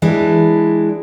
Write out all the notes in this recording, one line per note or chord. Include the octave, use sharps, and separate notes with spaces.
E3 G#3 D4